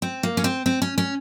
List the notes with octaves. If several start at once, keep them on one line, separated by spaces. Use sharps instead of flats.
C4
A#3
C#4
C4
C4
C#4
C#4